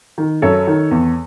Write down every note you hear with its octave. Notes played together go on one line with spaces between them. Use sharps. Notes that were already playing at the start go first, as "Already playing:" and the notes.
D#3
F#2 A4 C#5
D#3
E2